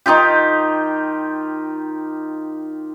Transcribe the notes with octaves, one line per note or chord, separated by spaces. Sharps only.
D#3 D#4 F4 G4